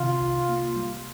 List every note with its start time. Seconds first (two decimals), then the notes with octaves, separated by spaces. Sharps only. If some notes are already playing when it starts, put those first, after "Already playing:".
Already playing: C3 D#3 F4
0.21 C2
0.49 A#3
0.76 G3